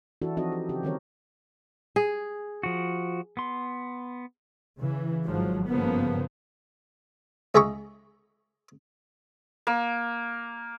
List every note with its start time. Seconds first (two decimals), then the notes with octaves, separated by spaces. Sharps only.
0.22 E3 D4 E4 F#4 A4
0.37 F3 C4 D#4 F#4 A4 D#5
0.52 G4
0.69 C#3 C4 G4
0.83 D#3 G3 C4 A4 A#4 C#5
1.96 G#4
2.63 F3 F#4
3.37 B3 C6
4.79 C#3 E3
5.25 G#1 G#2 F3 F#3
5.67 G2 C#3 F3 A#3 B3
7.55 C#2 G#3 G#4 E5 A#5 C#6
9.67 A#3